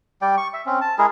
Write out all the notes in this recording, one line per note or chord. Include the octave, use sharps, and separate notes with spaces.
G3 D5 G5
C#6
E5
C4 C#4
A5
G#3 E4 G#4 A#4